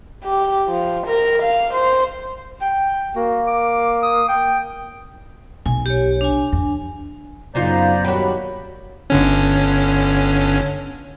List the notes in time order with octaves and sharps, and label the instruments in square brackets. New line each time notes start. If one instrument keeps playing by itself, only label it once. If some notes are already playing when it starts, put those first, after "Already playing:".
[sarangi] G4
F3
A#4
F5
C5
[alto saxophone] G5
[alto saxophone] A#3 [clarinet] F#4
[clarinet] D6
D#6
G5
[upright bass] B1 [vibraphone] G#5
[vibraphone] G4 C#5
D4 G#5
[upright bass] F2
[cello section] F#2 B3 [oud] C#3 D#4 F4 [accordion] C5 D5 A#5
[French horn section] D#2 C#5 [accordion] G3 B5 [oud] F#4 G4
[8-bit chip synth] G1 D3 C#4